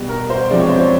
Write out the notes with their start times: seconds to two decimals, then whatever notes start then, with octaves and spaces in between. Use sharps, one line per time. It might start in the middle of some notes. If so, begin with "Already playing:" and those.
Already playing: B2 G3
0.09 A#4
0.30 C5
0.51 F2 C3 F3 G#3 D5
0.60 C#5
0.69 C5
0.78 C#5